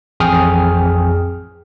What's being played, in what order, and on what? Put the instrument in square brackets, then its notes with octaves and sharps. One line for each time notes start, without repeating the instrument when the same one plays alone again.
[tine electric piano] A1 F2 G#4 G5 D#6 F6